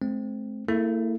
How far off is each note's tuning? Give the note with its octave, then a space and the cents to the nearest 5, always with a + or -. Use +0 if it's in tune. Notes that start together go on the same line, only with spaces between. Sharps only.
A3 -45 C4 +0
A#3 -45 E4 +0 A4 -30